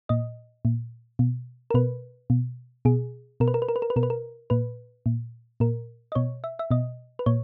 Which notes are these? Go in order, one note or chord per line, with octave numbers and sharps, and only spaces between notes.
A#2 D#5
A#2
B2
A#4
B2 B4
B2
B2 G#4
B2 A#4
B4
A#4
B4
A#4
B4
A#4
B4
B2 A#4
B4
A#4
A#2 B4
A#2
A#2 A#4
D#5
B2 C#5
E5
E5
B2 D#5
B4
A#2 C#5